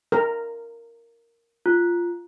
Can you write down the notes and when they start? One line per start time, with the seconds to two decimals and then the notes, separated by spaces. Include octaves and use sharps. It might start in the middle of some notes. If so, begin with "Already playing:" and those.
0.12 A#4
1.66 F4